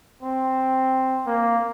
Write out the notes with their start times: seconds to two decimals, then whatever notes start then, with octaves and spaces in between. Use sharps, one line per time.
0.23 C4
1.26 A#3